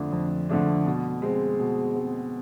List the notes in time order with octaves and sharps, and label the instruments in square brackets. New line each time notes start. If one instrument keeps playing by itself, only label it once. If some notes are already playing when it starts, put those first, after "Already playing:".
Already playing: [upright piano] F2 D3 F3 A3 D4
F2
D3 F3 A3 D4
B2
G#3 C4
B2
G#3 C4